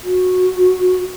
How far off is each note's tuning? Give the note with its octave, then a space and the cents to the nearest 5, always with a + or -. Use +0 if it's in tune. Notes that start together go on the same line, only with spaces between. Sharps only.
F#4 -15